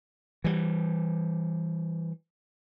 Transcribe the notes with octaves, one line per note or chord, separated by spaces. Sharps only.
E3 G3